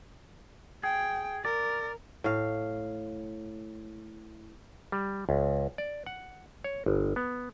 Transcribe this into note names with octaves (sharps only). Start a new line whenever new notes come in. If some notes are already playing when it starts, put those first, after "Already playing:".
G#4 G5
A#4 D5
A2 F5
G3
C#2
D5
F#5
C#5
G1
B3